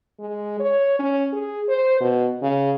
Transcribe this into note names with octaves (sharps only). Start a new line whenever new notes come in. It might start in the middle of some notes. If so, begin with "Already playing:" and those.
G#3
C#5
C#4
G#4
C5
B2
C#3